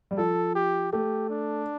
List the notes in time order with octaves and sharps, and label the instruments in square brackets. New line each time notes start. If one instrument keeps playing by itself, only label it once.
[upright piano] G3
[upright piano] F3 [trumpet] A4
[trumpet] G4
[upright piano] A3 [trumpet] G4
[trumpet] D4